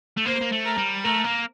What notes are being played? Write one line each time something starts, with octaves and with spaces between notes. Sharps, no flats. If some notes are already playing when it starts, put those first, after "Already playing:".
A3
A#3 C5
A#3
A3
A#4
G3
A3 A#4
A#3